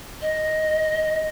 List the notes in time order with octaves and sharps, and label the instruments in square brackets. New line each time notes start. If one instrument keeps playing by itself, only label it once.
[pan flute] D#5